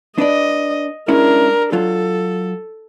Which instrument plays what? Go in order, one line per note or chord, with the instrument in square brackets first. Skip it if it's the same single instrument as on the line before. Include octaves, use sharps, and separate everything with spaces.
[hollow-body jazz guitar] D4 B4 D5 [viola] D#5
[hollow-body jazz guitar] G#3 C#4 E4 [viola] D4 A#4
[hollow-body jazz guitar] F#3 F4 [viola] A4